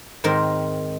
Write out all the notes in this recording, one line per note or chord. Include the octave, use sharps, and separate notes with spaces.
G#2 D#3 C4 A#4